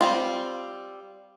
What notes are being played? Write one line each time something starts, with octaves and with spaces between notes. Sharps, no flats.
G3 C4 F4